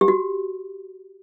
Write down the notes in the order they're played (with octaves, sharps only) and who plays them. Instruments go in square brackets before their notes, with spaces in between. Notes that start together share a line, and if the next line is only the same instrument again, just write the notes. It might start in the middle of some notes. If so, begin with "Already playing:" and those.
[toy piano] G4
F#4